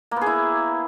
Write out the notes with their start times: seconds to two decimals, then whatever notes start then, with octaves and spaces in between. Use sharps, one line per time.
0.11 A#3
0.16 B3
0.21 G#4
0.26 E4